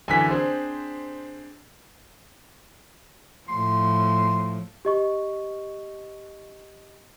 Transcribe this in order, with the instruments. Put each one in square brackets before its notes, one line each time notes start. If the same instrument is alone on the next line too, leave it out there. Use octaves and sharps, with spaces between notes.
[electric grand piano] F#2 D3 E3 [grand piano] G#5 B6
[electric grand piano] C4 D4 G#4 [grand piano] C5
[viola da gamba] A2 F3 [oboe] C6
[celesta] G4 D#5 C#6